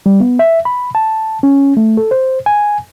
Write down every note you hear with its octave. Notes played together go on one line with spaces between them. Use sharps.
G3
B3
E5
B5
A5
C#4
A3
A4
C5
G#5